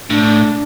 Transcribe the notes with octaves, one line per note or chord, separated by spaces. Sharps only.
A2 D4